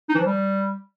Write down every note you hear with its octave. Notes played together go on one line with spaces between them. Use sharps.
D#4
E3
F3
G3